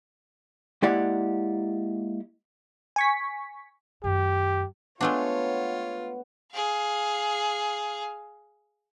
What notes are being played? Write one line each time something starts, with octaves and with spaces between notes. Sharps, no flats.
G#3 A#3 E4 G4 D5 F#5
G#5 C#6 B6
F#2 D#3 G4
G#3 A3 B3 D4 F4 C#5
G#4 F5